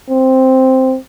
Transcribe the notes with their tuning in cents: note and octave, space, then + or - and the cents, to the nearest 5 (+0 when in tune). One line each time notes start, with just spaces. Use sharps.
C4 +0